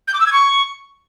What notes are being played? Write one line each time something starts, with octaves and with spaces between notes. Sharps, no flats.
G6
D6
E6
G#6
C#6